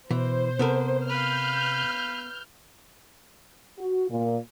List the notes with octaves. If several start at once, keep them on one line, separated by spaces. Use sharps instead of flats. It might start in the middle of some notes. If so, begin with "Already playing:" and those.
B2 E3 C5
C3 B3 A4 A#4
B4 F5 F6 G6
F#4
A#2